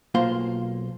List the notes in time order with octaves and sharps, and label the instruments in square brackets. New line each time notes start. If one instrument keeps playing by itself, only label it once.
[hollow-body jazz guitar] B1 A#3 F4 C5 C6